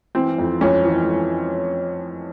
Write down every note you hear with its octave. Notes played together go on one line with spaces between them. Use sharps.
E3 C4
F2
F2 C#4
E3